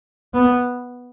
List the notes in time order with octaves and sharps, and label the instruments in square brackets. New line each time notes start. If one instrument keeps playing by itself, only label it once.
[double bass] B3